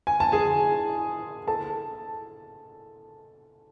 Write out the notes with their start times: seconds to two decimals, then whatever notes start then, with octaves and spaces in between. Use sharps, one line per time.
0.07 G#5
0.20 A5
0.32 G#4 G#5
1.48 A4 A5